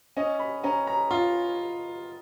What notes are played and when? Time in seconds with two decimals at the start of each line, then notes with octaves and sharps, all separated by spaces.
0.17 C#4 D#5
0.39 B5
0.64 C#4 A#5
0.87 A#5
1.11 F4